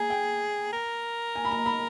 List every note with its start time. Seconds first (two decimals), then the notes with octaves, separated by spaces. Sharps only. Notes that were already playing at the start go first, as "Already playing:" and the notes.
Already playing: G#4 G#5 A#5
0.10 G5
0.73 A#4
1.35 G#5
1.45 B5
1.51 A#5
1.66 B5